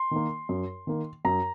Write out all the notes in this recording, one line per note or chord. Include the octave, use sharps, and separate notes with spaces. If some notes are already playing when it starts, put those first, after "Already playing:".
Already playing: C6
D#3 A#3
F#2
D#3 A#3
F#2 A#5